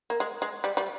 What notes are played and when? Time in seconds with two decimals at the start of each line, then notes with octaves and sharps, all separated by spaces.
0.10 A#3
0.20 G#3
0.42 G#3
0.64 G3
0.77 G3